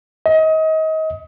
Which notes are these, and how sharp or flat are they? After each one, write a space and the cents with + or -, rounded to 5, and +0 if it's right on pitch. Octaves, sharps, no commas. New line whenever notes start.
D#5 +30